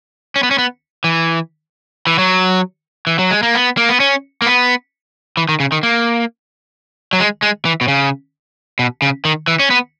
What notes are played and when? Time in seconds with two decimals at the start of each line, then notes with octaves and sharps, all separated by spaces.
0.36 C#4
0.43 B3
0.51 C#4
0.58 B3
1.04 E3
2.07 E3
2.19 F#3
3.07 E3
3.19 F#3
3.31 G#3
3.43 A#3
3.55 B3
3.77 A#3
3.89 B3
4.00 C#4
4.42 A#3
4.46 B3
5.37 E3
5.49 D#3
5.60 C#3
5.72 D#3
5.83 A#3
7.13 F#3
7.20 G#3
7.42 G#3
7.65 E3
7.81 B2
7.88 C#3
8.79 B2
9.02 C#3
9.25 D#3
9.48 E3
9.59 C#4
9.70 B3